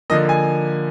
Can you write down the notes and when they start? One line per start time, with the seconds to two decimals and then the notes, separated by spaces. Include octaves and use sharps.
0.10 D3 F3 A#3 D#5
0.29 G#5